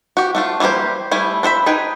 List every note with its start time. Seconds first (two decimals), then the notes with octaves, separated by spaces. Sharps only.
0.17 F#4 G4
0.35 A3 D4 F4
0.60 E3 G3 A#3 G4 C5
1.11 G3 A3 E4 G#5
1.43 D4 C5 E5 B5
1.66 D#4 G#4 B4 G5